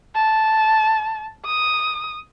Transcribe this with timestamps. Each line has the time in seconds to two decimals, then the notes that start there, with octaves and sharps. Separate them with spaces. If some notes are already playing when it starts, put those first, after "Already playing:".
0.15 A5
1.45 D#6